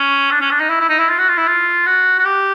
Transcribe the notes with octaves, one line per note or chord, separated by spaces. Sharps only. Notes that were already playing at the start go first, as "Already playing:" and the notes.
Already playing: C#4
D4
C#4
D4
D#4
E4
E4
D#4
E4
F4
F#4
F4
E4
F4
F#4
F#4
G4